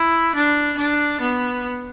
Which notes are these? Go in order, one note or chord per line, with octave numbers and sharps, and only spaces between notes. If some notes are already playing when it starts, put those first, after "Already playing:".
Already playing: E4
D4
D4
B3